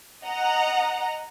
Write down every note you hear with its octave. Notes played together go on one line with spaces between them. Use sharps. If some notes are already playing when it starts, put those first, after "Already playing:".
D#5 F#5 A#5